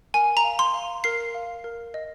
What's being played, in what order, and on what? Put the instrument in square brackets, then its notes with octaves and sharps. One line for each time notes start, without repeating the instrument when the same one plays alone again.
[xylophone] A#4 G#5
A#5
F5
C6
F5
A#4 C7
F5
A#4
D#5